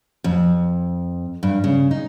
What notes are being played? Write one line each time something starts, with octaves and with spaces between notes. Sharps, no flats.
F2
G2
C#3
D#4